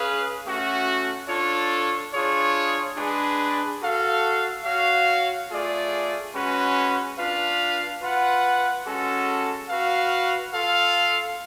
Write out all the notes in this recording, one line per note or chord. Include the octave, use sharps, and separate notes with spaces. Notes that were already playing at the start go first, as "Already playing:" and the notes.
Already playing: C#4 G#4 B4 F5
A3 C#4 F#4
D4 F4 A4 C#5
D4 F4 G#4 C#5
G#3 D4 G#4 B4
F#4 A4 F5
F#4 C#5 F5
A3 F4 G#4 D5
G#3 C#4 F#4 B4
D4 F4 B4 F5
F4 B4 F#5
G#3 C#4 F#4 A4
F#4 B4 F5
F4 A4 F5